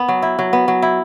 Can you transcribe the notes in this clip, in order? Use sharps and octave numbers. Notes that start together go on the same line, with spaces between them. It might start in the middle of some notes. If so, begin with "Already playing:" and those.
Already playing: B3
F#3
E4
F#3
B3
F#3
E4